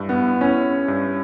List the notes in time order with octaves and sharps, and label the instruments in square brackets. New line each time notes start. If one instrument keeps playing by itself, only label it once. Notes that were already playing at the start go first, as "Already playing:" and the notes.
Already playing: [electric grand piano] G2 E4
[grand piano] B3
[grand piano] C#4 [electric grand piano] E4
[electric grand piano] G2